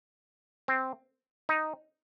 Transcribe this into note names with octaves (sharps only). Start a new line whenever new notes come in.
C4
D#4